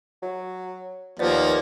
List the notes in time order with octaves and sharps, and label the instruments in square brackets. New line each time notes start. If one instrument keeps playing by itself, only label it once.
[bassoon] F#3
[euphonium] D#2 [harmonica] F3 A#3 [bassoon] B3 [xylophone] C5 D5